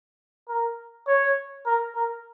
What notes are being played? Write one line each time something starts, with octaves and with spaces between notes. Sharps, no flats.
A#4
C#5
A#4
A#4